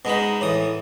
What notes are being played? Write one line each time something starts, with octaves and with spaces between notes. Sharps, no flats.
B2 G#3 D#4 B5
A2 E3 D#6